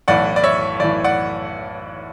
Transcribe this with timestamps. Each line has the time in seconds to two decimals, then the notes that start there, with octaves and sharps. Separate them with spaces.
0.08 B1 A2 E3 D5 F#5
0.36 D5
0.44 C#5 E5
0.80 B1 D5
0.82 A2 E3
1.04 D5 F#5